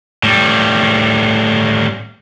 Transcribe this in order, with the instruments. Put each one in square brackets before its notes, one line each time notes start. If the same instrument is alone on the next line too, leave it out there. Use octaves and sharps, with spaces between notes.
[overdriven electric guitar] A2 G3